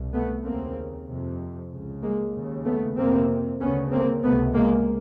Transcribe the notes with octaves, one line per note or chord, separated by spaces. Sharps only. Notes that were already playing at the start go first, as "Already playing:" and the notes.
Already playing: C2 B2
A3 B3
D#2 C#3 A#3 C4
F2 C3
C#2 C#3
G#3 A#3
D#2 C#3
A3 B3
F2 C3 A#3 C4
D2 C#3 B3 C#4
A#3 C4
C#2 C3 A3 B3
G#3 A#3